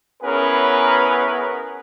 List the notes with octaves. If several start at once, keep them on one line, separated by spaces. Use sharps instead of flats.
B3 C#4 E4 G#4 A#4 B4